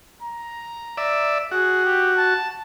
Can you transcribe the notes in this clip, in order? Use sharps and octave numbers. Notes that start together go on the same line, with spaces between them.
A#5
D5 E5
F#4 G#4
G4
A5